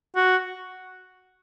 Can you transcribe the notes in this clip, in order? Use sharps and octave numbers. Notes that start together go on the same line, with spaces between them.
F#4